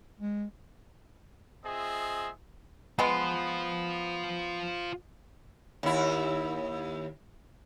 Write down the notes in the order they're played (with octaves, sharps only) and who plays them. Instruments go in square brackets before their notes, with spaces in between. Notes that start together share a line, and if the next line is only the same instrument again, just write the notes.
[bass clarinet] G#3
[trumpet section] C4 F4 G#4 D#5 E5
[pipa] G#3 B3 [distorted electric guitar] F4 C5
[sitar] D#2 E4